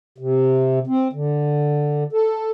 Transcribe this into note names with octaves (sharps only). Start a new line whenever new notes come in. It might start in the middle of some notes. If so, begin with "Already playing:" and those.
C3
C4
D3
A4